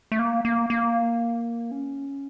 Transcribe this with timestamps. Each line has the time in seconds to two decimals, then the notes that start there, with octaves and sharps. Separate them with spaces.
0.12 A3
0.19 A#3
0.45 A#3
0.70 A#3
1.72 C#4